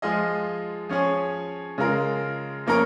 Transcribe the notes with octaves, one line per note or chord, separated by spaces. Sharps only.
F3 G#3 F4 G#4 D#5
F3 C#4 G#4 C#5
C#3 G#3 F4 A#4
F3 A#3 C#4 A#4